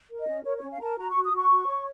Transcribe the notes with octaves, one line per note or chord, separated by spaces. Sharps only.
A#4
D#5
C#4
A#4 C#5
C#5
C#4
F5
A#4 A5 A#5
F#4 A#5
C#6
F#4
D#6
F#4 C#6
F#4
C#5